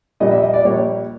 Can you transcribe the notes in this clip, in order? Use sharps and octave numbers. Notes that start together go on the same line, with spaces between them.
A#1 A#2 G3 D#5
E5
D#5
D5
A#1 A#2 G3 C#5